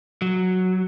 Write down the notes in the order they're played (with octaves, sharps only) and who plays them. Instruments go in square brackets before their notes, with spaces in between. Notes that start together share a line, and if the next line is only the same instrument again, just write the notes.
[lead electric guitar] F#3